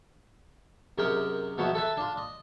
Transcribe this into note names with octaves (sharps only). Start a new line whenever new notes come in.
F#2 C3 G#4 A#4 D#5 G5
B2 F3 F#3 B3 E4
A4 B4 E5 G#5
D4 F4
D#5